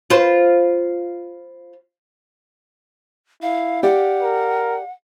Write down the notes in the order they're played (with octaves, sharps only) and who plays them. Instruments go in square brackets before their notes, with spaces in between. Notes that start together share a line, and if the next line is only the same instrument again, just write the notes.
[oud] F4 B4 C5
[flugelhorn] E4 [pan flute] F5
[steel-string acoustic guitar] G4 D5 F5 [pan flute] F#5
[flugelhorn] A#4